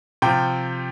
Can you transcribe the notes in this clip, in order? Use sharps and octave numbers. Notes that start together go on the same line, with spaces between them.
C3 F3 G5